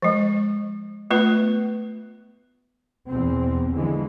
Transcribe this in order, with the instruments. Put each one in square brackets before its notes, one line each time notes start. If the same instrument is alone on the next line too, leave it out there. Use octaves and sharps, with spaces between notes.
[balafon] F3 G#3
A3 B3 F4 B4
[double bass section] E2 B2 C4
D3 E3 F3 G#3